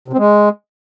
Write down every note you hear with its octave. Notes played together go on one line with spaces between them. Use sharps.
C3
C4
G#3